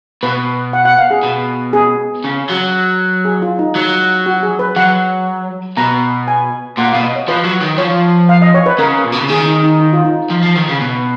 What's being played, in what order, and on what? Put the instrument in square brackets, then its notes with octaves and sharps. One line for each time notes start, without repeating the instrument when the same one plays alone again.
[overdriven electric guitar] B2 [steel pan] B4
[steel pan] F#5
F#5
F5
G#4
[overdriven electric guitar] B2
[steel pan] G#4
[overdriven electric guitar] C#3
F#3
[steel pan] G#4
F4
D#4
[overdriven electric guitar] F#3
[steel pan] F#4
G#4
B4
[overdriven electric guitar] F#3 [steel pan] F#5
[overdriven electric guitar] B2 [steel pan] A#5
[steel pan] G#5
[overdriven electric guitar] A#2 [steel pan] F#5
[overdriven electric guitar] B2 [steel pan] F5
[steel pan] D#5
C#5
[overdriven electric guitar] F3 [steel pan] B4
[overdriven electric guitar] F#3
D#3
[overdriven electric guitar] F3 [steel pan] C#5
[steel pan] F5
D#5
C#5
B4
[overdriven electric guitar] C#3 [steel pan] A#4
[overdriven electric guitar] A#2
B2
C#3
[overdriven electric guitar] D#3 [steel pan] G#4
[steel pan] D#4
D#4
D#4
F4
D#4
[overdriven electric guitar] F3
F3
D#3
C#3
B2